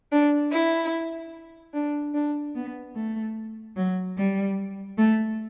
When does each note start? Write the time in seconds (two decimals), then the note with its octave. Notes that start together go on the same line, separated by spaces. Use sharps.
0.12 D4
0.52 E4
1.73 D4
2.14 D4
2.54 B3
2.95 A3
3.76 F#3
4.16 G3
4.97 A3